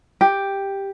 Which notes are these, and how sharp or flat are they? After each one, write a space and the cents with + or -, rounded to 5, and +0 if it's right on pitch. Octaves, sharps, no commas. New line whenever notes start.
G4 +5